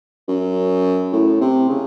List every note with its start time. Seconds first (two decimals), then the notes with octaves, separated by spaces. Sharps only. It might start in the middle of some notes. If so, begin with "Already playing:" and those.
0.29 F#2
1.13 A2
1.41 C3
1.69 C#3